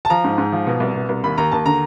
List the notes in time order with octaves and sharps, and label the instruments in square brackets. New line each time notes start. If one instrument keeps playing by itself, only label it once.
[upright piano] A5
F3 A#5
G#2
G#2
F3
B2
C2
B2
C2
D#2 B5
D#2 A#5
D#2 A5
D3 A#5